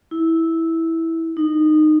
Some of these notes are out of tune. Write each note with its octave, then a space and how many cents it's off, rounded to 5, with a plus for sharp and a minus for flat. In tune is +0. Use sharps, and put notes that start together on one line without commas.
E4 -10
D#4 -20